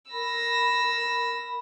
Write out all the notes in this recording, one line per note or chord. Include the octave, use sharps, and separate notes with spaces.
A#4 B5 E6 A#6